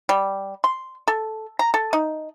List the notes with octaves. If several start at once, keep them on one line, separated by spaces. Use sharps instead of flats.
G3
C6
A4
A#5
A4
D#4